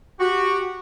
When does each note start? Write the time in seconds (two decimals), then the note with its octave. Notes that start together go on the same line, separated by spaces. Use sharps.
0.19 F#4 G4